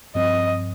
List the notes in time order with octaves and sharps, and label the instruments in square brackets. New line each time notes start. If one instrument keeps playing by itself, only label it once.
[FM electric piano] G2 F3 C4 [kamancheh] D#5